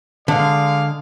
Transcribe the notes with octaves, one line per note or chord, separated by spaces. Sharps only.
D3 G#3 D5 F5